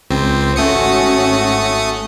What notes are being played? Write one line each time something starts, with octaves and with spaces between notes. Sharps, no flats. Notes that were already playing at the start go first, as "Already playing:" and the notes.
C#2 C4
G#1 A3 C#4 F#4 D#6 C#7